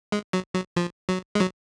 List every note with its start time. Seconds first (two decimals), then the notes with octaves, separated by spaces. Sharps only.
0.12 G#3
0.33 F#3
0.54 F#3
0.76 F3
1.09 F#3
1.35 G#3
1.40 F#3